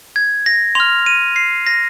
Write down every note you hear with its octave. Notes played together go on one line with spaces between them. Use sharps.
G#6
A#6
C6 F6 F7
D#7
C7
A#6